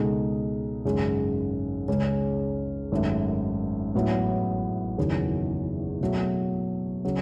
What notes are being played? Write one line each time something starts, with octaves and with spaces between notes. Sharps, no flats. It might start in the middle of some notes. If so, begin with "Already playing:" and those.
Already playing: C#2 B2 G#3 D#4 A4
G#1 F#2 C#3 G#3
C#2 C#3 G#3 C#4
G#1 F#2 D#3 A3
A1 A2 F#3 B3
F#1 E2 D#3 F#3 C#4
B2 F#3 A3
C#3 F#3